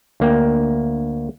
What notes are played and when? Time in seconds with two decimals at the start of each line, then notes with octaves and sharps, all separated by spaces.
0.20 D2 A#3 G5